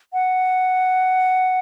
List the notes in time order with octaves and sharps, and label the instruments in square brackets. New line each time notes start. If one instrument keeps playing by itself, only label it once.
[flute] F#5